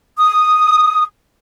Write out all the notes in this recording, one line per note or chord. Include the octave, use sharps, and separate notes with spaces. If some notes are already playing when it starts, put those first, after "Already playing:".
D#6